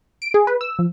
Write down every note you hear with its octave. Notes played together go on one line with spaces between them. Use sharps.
D7
G#4
B4
E6
F3